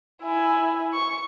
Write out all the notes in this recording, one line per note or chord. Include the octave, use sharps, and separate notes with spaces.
E4 G#5
C#6